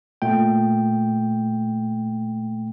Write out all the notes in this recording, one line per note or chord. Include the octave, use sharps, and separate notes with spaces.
A#2 A3 G5